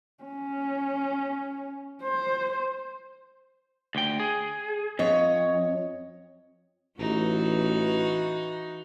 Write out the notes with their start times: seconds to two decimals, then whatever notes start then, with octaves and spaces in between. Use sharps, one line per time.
0.24 C#4
2.03 C5
3.95 D2 G5
4.20 G#4
4.99 F2 C#5 D#5
6.99 A1 E3 D#4 F#4